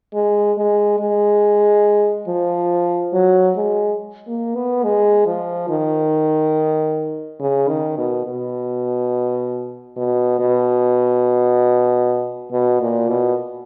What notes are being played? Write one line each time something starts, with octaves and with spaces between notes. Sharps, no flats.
G#3
G#3
G#3
F3
F#3
G#3
A#3
B3
G#3
F3
D#3
C#3
D#3
B2
B2
B2
B2
B2
A#2
B2